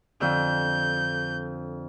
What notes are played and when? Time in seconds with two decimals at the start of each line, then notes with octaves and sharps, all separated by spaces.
0.21 F2 D3 G6